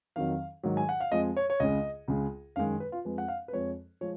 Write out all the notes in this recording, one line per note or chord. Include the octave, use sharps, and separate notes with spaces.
F2 D#3 F#3 F5
G#2 D#3 F#3
G#5
F#5
F5
F2 F3 G#3 D#5
C#5
C#5
C#2 C#3 G#3 D#5
C#2 C#3 G#3
F#2 D#3 G#3 F5
B4
F4
F2 F3 G#3 B4
F#5
F5
B4
F2 F3 G#3 C#5
F3 G#3 C#5